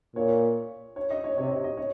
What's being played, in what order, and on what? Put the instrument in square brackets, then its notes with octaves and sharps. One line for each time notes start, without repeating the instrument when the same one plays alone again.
[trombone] A#2 [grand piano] C#5
[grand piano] C#5
D#5
C#5
[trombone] C3 [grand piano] C#5
[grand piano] D#5
D#5
C#5